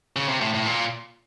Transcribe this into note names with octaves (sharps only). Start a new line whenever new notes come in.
C#3
C3
A2
A2
A#2